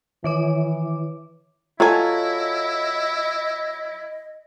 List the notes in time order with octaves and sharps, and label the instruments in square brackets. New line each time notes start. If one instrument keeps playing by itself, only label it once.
[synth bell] D#3 C#5 D6 [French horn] E3
[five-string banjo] F#3 G#5 [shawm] E4 [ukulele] F4 A4 [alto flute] D#5